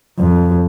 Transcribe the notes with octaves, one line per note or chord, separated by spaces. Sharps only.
F2